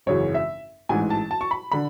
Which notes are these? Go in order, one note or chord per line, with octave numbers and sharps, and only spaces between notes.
G#1 F#2 C#3 E3 C#5
E5
A1 G#2 E3 G#5
A5
A5
C#6
B5
D3 B5